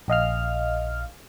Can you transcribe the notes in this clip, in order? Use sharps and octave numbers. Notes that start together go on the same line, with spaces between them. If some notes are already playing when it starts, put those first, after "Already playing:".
A#1 D#5 F5 F6